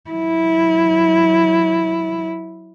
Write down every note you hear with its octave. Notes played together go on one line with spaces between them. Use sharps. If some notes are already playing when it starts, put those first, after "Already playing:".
F#3 E4